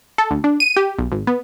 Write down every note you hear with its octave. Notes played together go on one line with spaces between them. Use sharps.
A4
D2
D4
D#7
G4
B1
G#1
B3